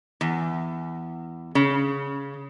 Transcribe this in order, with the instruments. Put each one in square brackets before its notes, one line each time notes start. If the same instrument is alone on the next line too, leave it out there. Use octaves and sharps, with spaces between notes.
[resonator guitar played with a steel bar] E2
C#3